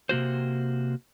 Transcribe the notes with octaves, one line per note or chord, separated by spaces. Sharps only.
C3 A#3 F#4 C5